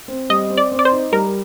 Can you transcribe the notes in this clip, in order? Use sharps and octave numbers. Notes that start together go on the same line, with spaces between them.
C4
G3 D#5
C4
D5
C4
D5
C5
D#4
G3 A#4